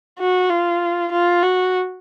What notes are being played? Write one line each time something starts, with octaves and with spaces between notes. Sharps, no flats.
F#4
F4
F4
F#4